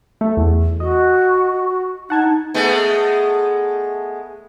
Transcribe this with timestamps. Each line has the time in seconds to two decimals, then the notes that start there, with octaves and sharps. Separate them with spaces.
0.21 A3
0.37 E2
0.80 F#4 D#5
2.10 D#4 F#5 A5 G#6
2.54 G#3 A3 B3